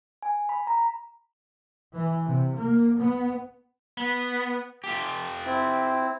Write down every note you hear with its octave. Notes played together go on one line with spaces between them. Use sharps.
G#5
B5
A#5
E3
C3
A#3
B3
B3
F4 G4
C4 E4